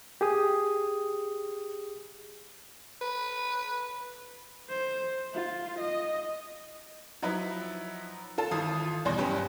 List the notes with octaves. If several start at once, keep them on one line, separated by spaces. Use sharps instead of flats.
G4 G#4 D#6
B4
C5
F4
D#5
F3 F#3 D#4 E4 B4 E5
F4 A4 A5
G#1 E3 F4 D#6
E2 B2 G3 C6 A#6
F#1 G2 C#4 G4 B4